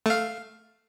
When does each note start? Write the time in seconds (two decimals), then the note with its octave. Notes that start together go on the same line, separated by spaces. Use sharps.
0.06 A3 F5